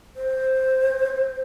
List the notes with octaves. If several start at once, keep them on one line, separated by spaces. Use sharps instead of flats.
C5